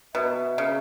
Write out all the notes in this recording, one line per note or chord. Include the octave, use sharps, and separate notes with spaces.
B2 E5
C#3